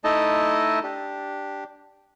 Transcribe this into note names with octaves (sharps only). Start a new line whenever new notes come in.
A3 D#4 E4 D#5 A5
D4 G4